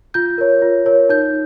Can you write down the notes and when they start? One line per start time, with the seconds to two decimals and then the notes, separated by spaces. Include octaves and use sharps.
0.14 F4 G6
0.38 A#4 C#5
0.62 F4
0.86 A#4 C#5
1.09 D#4 G6